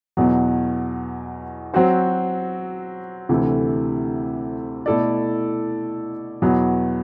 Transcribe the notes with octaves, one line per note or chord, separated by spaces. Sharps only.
E2 B2 F#3
F#3 C4 F#4 C5
D2 C3 E3 A3
B2 A3 E4 A4 D5
E2 B2 F#3 B3